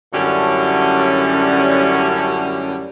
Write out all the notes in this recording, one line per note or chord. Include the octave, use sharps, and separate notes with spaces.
F#2 A2 D3 F#3 G3 C#4